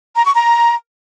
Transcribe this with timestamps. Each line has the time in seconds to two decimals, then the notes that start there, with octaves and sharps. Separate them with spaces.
0.15 A#5
0.25 C#6
0.35 A#5